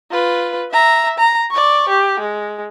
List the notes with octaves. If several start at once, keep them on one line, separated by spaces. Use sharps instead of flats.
F4 B4
E5 A#5
A#5
D5 C#6
G4
G#3